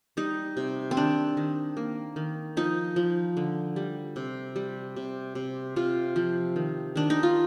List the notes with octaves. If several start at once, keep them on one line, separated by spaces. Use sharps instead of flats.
G3 D#4
C3
C4
D#3 D4
D#3
A#3
D#3
F3 D#4
F3
D3
G3
C3
G3
C3
C3
C3 F4
F3
D#3
D#3 D4
D#4
F4